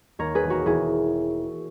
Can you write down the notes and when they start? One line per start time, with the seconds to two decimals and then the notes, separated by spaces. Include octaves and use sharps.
0.19 D#2 A#4 C#5
0.35 G#4 B4
0.43 E1
0.50 F#4 A#4
0.65 E1 E4 G#4